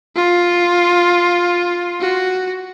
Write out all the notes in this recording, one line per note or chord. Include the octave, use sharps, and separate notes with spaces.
F4
F#4